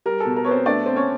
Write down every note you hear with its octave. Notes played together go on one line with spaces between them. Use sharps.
G3 A#4
B2 A4
A#4
B3 C#5
C4 C5
A3 D4 D5
C4
C#4 C#5